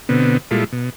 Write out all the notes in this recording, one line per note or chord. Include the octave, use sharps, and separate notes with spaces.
B2 D3 B3 C4
A#2 G3 G#3 E4 F4 A4
B2